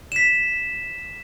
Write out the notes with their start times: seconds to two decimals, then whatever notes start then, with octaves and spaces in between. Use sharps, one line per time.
0.12 B6 E7